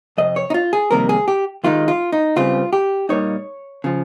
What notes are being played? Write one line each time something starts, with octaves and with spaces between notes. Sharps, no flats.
F2 C3 D#5
C#5
D#4
F4
G#4
F2 C3 D#3 G3 A#3 A#4
G#4
G4
D#2 D#3 G#3 D#4 F4
F4
D#4
C#2 C#3 G3 C4 F4
G4
A#2 G3 A#3 D#4 C#5
C#3 F3